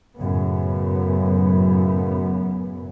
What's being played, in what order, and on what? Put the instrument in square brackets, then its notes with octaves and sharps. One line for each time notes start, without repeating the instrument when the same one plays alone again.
[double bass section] F#2 A2 C#3 B3